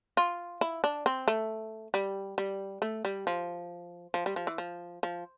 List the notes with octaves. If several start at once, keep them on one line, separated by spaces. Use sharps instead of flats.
F4
E4
D4
C4
A3
G3
G3
A3
G3
F3
F3
G3
F3
E3
F3
F3